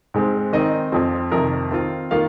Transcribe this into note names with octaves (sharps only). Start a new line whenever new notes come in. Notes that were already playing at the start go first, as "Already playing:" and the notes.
G#2 G#3 C4
D#3 C4 D#4 D#5
F2 F3 C4 F4
F2 C3 D#3 A#4
D#3 C4 F4
D#3 A#3 F4 F5